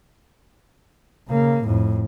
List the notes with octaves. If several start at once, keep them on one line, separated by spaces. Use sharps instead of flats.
C#3 A#3
F2 A2